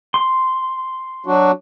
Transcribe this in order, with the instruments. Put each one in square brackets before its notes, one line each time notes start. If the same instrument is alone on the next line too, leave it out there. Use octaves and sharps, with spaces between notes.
[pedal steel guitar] C6
[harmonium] F#3 D4 F#4